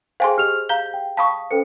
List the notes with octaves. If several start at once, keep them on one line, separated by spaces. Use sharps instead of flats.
G#4 C5 F5 G5 G#5 C6
G4 D#5 F6 F7
F5 A#5 G6 G7
G5
F5 A5 B5 C#6 D#6
C#4 A4 B4 C5 C#7